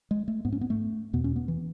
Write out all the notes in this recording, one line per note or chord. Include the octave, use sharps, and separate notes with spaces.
G#3
A3
G#2 B3
C#4
B3
A3
E2 B2 B3
C#4
B3
E3